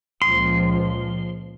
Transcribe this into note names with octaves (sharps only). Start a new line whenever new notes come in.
C#2 A#2 F3 C6